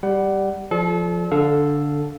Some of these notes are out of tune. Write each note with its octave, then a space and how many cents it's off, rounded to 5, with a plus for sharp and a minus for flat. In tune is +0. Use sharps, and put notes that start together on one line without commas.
G3 +0 F#5 +25
F3 +0 A4 -35 D5 -10
D3 -5 A4 +0 F5 +0